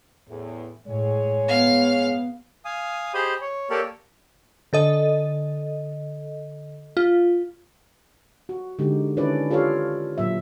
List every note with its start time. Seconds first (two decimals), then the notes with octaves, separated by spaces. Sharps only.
0.28 E2 A2
0.87 A2 G#3 G#4 C#5
1.48 B3 F5
2.65 F5 G#5 D#6
3.14 G4 G#4 C5 D#5 B5
3.41 C#5
3.70 A#3 G4 A4 A#4 C#5 D5
4.73 D3 A4 D#5
6.97 F4
8.49 F#4
8.79 D3 G#3 D#4 G4
9.17 D#3 C#4 D4 E4 B4 D5
9.50 F4 G4 A4 C#5 D5 F5
10.18 A#2 F#3 E5